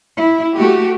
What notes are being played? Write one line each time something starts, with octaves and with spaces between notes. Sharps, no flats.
E4
A3 F#4 G4